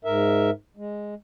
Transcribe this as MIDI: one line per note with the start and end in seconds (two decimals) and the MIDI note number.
0.05 0.50 44
0.05 0.50 70
0.05 0.50 76
0.77 1.14 56